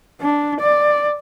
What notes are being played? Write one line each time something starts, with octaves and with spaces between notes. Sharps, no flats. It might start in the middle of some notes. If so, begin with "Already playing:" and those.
D4
D5